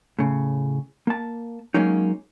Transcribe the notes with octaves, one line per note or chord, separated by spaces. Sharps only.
A2 C#3
A#3 A5
F#3 G#3 A#3 C#4 D#4